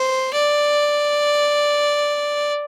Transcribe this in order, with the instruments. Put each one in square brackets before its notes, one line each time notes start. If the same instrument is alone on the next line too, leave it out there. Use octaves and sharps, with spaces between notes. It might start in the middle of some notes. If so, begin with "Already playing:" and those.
Already playing: [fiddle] C5
D5